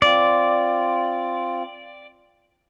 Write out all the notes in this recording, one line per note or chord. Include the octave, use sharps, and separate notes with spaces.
C4 F4 D5